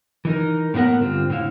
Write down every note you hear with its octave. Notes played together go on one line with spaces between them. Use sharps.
E3 D#4 A#4
A2 A#3 B3 A#4 F#5
G2 D3 C4 F4
A2 D3 E4 F5